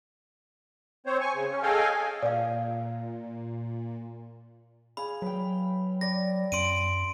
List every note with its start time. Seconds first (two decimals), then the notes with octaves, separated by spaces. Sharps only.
1.06 C4 C5 C#5
1.21 G#5 C#6
1.34 C#3
1.51 C#4
1.63 G#4 A4 D#5 F5 G5 G#5
2.23 A#2 D5 F5
4.97 G#4 F5 B5
5.22 F#3 B4 G5
6.01 D5 D6 A#6
6.52 F#2 C6 D7 D#7